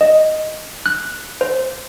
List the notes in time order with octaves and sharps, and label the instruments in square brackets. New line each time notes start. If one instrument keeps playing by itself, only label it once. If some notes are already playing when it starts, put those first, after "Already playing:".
[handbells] D#5
F#6
C5